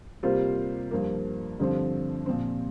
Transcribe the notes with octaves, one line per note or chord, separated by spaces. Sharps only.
C3 G3 A#3 F4 C5
G2 F3 A#3
G2 D3 F3 C4
A#2 F3 C4